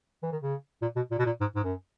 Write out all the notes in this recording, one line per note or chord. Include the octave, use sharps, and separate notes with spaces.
E3
D#3
C#3
A#2
B2
A#2
B2
A#2
G#2
G#2
F#2